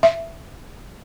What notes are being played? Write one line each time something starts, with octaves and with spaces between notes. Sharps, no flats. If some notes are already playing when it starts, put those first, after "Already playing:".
E5